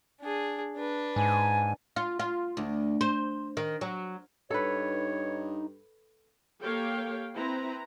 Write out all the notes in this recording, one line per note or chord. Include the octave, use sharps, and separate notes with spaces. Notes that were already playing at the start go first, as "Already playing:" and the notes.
D4 G#4
D4 B4
G#2 G#5
F4
F4
D2
C5
D#3
F#3
G2 D#4 A4 B4 C#5
A#3 G4 A4 C#5 F5 G5
C4 E4 B4 A#5